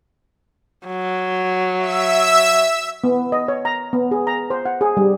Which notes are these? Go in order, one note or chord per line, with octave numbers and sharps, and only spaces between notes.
F#3
E5 E6
B3
D#5
C#5
A#5
B3
G#4
A#5
C5
F#5
G#4
G3